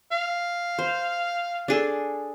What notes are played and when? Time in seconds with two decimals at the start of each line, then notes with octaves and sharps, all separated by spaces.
0.11 F5
0.78 C5
1.68 D4 G#4 A4